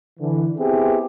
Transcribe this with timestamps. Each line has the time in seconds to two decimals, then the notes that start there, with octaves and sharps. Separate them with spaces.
0.20 D3 E3
0.58 B3 C4 E4 G4 G#4